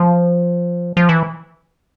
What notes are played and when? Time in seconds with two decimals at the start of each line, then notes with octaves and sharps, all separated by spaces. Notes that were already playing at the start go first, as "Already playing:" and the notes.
Already playing: F3
0.97 F3
1.09 E3